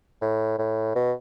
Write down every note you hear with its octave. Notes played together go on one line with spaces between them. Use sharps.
A2
A2
B2